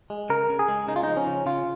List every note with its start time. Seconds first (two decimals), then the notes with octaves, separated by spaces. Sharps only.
0.10 G#3
0.30 C#3 A#4
0.50 C#3
0.59 G#4
0.69 G#3
0.88 C#3 D#4
0.96 F4
1.03 F3 D#4
1.17 C#4
1.27 C#3
1.46 C#3 F4